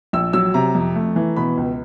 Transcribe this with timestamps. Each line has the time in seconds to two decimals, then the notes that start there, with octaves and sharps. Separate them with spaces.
0.13 A#1 E6
0.33 F#3 E6
0.54 C3 A#5
0.75 F2
0.96 A3
1.16 E3
1.36 B2 B5
1.57 C#2